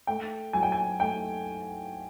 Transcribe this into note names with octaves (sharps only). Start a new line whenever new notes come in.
A3 G5
F#3 G#5
G5
G#5
A3 G5